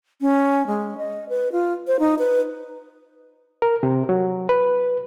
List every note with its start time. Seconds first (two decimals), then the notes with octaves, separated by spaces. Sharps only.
0.21 C#4
0.67 G#3
0.98 D#5
1.29 B4
1.52 F4
1.87 C5
2.00 D#4
2.19 B4
3.62 A#4
3.83 C3
4.09 F#3
4.49 B4